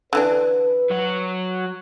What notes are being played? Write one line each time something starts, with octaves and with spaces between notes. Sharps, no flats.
D3 E3 D4 B4
F#3 F#4